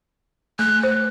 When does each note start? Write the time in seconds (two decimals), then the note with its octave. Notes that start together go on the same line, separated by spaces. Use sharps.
0.59 A3 F#6
0.83 C5